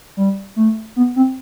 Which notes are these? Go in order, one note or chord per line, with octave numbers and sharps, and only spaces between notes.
G3
A3
B3
C4